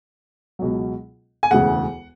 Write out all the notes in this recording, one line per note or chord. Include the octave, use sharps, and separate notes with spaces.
C#2 B2 F#3
G#5
E1 D2 C#3 E3 F#5